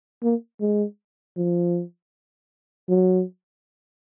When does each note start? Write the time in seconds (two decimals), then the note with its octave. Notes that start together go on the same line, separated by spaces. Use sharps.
0.23 A#3
0.61 G#3
1.37 F3
2.89 F#3